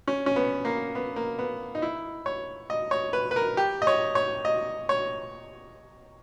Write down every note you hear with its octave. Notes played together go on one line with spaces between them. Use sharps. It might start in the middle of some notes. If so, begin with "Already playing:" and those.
C#4
C#4
B3
A#3
B3
A#3
B3
D#4
E4
C#5
D#5
C#5
B4
B4
A#4
G4
D#5
C#5
C#5
D#5
C#5